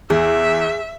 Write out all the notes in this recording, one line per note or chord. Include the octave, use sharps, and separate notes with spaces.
E2 G#4 E5